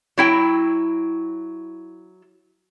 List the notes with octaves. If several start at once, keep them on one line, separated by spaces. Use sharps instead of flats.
F#3 E4 G5